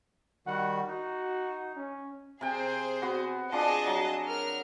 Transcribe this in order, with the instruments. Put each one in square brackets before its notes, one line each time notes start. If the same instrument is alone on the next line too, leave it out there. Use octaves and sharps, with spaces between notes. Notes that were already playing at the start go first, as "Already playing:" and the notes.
[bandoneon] D#3 G3 F#4 [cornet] F#5
[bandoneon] D#4 [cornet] F#4
[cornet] C#4
[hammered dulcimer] C3 G5 [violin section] G#4 C5
[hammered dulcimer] B3 F#4
[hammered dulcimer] F3 D4 [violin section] G#4 D#5 A5
[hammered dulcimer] F#3
[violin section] A#4 F6